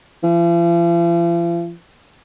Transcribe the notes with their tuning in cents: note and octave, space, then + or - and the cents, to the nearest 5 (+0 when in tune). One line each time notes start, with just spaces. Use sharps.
F3 -45